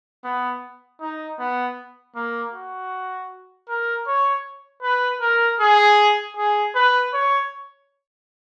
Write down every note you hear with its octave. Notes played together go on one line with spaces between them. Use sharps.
B3
D#4
B3
A#3
F#4
A#4
C#5
B4
A#4
G#4
G#4
B4
C#5